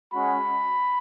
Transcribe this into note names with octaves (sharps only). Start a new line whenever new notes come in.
G#3 C#4 F#4 B5